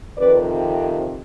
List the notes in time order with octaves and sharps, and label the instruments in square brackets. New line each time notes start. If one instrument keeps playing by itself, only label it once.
[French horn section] F2 C3 D#3 B4 D5